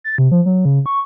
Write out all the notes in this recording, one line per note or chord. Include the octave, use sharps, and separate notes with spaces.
A6
C3
F3
F#3
C#3
C#6